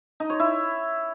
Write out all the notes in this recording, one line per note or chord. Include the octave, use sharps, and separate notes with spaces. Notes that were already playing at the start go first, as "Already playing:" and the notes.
D#4
C#5
E4